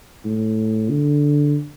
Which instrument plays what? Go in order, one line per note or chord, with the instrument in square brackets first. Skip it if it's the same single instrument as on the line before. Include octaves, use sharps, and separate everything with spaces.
[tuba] A2
D3